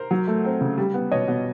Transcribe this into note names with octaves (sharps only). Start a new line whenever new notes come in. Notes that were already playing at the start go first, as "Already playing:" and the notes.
Already playing: A#4 C5
F#3
A3
C4
C#3
G3
B3
B2 C#5 D#5
B2